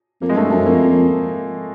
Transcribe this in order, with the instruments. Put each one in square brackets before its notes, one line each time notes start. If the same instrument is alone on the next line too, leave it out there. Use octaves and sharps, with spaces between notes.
[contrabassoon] F2 [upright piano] A#3
[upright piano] G#3
[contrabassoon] G2 [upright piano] A3
[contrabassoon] F#2 [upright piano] A3
[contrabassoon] F2 [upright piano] A#3